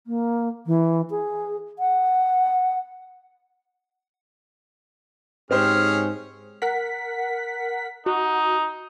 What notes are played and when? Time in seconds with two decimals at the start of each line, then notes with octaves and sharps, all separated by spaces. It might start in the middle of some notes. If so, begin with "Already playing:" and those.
0.07 A#3
0.67 E3
1.10 G#4
1.79 F#5
5.51 G#2 C4 C#4 G4 G#4 C5 F6
6.62 A#4 F#5 B6
8.06 D#4 F#4